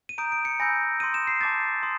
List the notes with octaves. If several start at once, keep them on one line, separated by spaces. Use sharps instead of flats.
D#7
A#5 D#6 G6 D7
D7
C#7
G#5 B5 E6 G6 A#6
C6 D#6 G6 D#7
E7
C7
A5 D6 G6 A6
C6 D#6